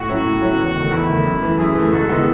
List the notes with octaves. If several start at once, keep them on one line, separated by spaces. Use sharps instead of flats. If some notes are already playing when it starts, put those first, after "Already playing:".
Already playing: A2 F#4
F#3 C#4 E4
A2
F#3 C#4 E4
E2
D#3 A3
E2 E4
D#3 A3
F#2
E3 A3
F#2 E4 G#4
E3 A3
G#2 F#4 A4
D#3 G#3 B3 E4